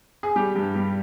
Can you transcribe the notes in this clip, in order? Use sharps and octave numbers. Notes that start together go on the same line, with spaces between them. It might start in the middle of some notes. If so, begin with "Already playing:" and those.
G#4
G3 G4
G2
G3